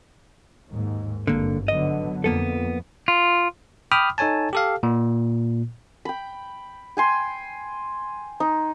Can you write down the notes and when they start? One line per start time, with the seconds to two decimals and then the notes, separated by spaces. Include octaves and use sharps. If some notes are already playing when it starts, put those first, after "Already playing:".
0.69 D#2 G#2
1.27 G#1 G2 D3 A#3
1.68 D3 F#3 B3 D#5
2.24 F2 A#3 B3 A4
3.08 F4
3.91 G5 B5 D6 D#6 F6
4.18 D#4 A4 C#5 G#5 A5
4.53 G4 A4 F5
4.83 A#2
6.05 G5 B5
6.97 G5 G#5 C6
8.40 D#4